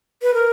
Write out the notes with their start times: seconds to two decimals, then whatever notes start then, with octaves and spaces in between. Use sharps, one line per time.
0.22 B4
0.34 A#4